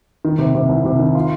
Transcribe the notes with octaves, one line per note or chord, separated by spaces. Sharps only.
D#3
C3
C3
C2
C3
D#3
F4